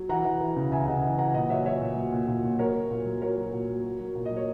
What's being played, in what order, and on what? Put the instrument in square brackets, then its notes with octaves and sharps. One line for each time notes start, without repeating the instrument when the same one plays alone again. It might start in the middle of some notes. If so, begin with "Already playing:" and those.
Already playing: [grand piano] F#3
E3 F#5 A#5
E3
E3
C#3
C#3 E5 G#5
C#3 D#5 F#5
E3
E3 F#5 A#5
A#2 D#5 F#5
F#3 C#5 E5
F#3 C#5 E5
A#2
F#3
A#2
A#2
A#2
F#3 A#4 C#5
F#3
A#2
F#3
F#3 A#4 C#5
F#3
A#2
F#3
F#3
F#3
A#2
D#5
F#3
C#5